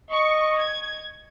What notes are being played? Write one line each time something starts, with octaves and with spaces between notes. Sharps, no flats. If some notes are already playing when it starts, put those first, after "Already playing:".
D#5 C#6
G#6